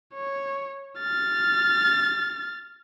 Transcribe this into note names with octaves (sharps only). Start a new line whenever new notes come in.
C#5
F6 A6